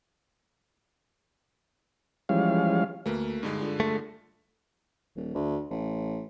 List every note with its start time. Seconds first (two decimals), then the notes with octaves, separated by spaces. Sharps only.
2.29 E3 F3 G3 G#3 C#4 F5
3.06 D2 A3 A#3 B4
3.43 G2 D3 G#3 D#4
3.60 D4 F4 A4
3.80 A3
5.16 D#1
5.35 D2
5.71 A1